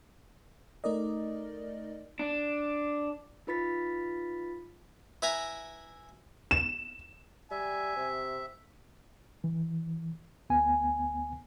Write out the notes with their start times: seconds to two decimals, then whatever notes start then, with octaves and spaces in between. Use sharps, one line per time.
0.84 A3 D#4 A#4 D5 D#5
2.19 D4
3.47 D#4 F4 B4 B5 A6 B6
5.22 E4 B4 E5 G#5 A#5
6.51 E7
7.51 G3 E5 G#5
7.96 C3
9.44 E3
10.50 D2 B3 G#5